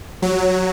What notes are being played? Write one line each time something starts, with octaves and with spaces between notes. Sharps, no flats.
F#3